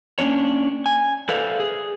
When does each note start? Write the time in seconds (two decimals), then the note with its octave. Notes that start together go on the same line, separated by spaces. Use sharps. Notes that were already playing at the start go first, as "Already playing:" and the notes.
0.19 A#3 C#4 D4 C#5
0.86 G#5
1.29 A4 B4 C5 D5 E5 F5
1.60 G#4